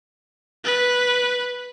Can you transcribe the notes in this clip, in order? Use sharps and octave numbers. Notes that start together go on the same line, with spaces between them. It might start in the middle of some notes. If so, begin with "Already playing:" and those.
B4